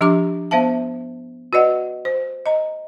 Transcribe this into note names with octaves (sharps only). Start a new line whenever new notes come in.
F3 D4 G4 A#5 D6
B3 C5 E5 F5 A5
F#4 B4 D5 D#5 F#5
C5
D#5 A#5